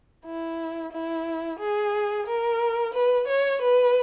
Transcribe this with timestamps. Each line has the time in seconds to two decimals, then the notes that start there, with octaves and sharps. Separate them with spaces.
0.25 E4
0.92 E4
1.59 G#4
2.27 A#4
2.94 B4
3.28 C#5
3.62 B4